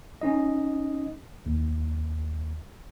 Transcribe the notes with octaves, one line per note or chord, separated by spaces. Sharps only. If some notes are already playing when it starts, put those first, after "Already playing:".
C#4 D#4 D#5
D#2